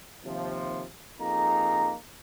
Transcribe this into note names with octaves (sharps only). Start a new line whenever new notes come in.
D#2 C3 F3
F2 A#3 D#4 G#4 A#5